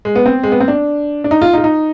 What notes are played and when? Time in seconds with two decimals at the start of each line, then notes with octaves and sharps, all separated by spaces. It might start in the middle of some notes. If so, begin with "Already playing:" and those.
0.05 G#3
0.15 B3
0.26 C4
0.43 G#3
0.52 B3
0.60 C4
0.68 D4
1.24 D4
1.31 D#4
1.42 F4
1.53 D#4
1.58 F4
1.64 D#4